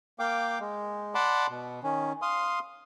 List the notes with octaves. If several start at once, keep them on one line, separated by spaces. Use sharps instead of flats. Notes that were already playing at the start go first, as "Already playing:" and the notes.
A#3 F5 G5 D6
G#3
D5 F#5 A5 B5 C6 D6
B2
D#3 C#4
F5 C6 D#6